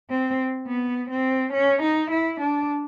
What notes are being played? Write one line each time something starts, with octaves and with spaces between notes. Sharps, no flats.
C4
B3
C4
C#4
D#4
E4
D4